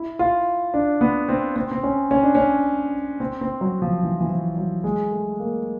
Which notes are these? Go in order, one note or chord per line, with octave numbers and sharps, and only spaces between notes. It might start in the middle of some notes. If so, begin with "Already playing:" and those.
Already playing: E4
F4
D4
B3
C4
C4
C4
C#4
C#4
D4
C#4
C4
C4
F#3
F3
E3
E3
F3
F#3
G#3
A3
A#3